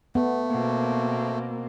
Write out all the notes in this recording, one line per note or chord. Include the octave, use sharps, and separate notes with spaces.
A3 B3
B2 A#3 C4